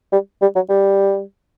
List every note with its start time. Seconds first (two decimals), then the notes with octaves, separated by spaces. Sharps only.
0.12 G3
0.42 G3
0.55 F#3
0.69 G3